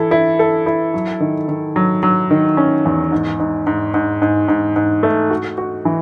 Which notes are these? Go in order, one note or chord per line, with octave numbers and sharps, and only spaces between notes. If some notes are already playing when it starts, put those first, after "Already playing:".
Already playing: E3 E4 A4
E4
A4
E4
F#3
D#3
D#3
F#3
F#3
D#3
C#4
E2
G#2
G#2
G#2
G#2
G#2
G#2
G#2
A3
F#4
F#4
E3